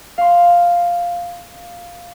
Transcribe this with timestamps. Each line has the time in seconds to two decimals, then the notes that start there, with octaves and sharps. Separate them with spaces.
0.18 F5 C6